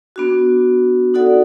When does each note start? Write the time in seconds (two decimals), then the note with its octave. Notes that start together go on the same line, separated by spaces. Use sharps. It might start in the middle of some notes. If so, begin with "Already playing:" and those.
0.16 B3 D4 F#4
1.14 D#4 F#4 A4 D5 F#5